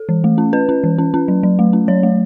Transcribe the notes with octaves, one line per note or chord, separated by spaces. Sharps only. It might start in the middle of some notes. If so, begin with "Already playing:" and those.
Already playing: A4
E3
A3
C#4
C#4 B4
C#4
E3
C#4
C#4
F#3
F#3
A3
C#4
F#3 C#5
A3